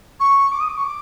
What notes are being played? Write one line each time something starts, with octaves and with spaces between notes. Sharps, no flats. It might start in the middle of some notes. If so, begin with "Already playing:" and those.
C#6
D6
D#6
D6
C#6
D6